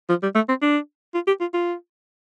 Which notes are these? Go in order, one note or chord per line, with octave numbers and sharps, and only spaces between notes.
F3
G3
A3
C4
D4
F4
G4
F4
F4